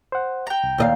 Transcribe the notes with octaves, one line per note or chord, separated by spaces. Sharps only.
C5 F#5
G5 A#5
C2
D#2 D#5 F5